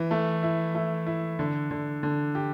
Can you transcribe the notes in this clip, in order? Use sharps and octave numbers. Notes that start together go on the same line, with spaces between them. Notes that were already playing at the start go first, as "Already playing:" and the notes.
Already playing: E3
A3
E4
A3
E4
D3
D3
D3
G4